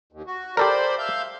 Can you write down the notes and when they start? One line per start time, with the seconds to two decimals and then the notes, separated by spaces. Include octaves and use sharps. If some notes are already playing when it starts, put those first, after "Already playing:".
0.13 D#2
0.27 F#4
0.57 G4 A4 A#4 C5 D5 B5
0.98 E5 F5 G6